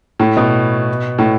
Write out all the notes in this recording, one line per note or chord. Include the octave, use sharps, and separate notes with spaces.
A2
B2
A2